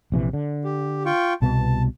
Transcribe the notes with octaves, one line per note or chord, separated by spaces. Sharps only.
A#1 C3 E3
D3
G4
F4 G5 C#6
C2 B2 B3 A5